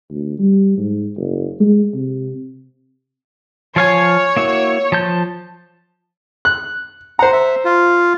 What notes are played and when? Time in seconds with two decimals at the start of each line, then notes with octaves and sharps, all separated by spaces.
0.10 D2
0.39 G3
0.77 G#2
1.16 F#1
1.60 G#3
1.94 C3
3.76 F3 C#5 F5 G#5
4.37 A#3 E4 F#4
4.92 F3 A5 G6
6.45 F#6
7.19 C5 F#5 A#5
7.33 E5
7.65 F4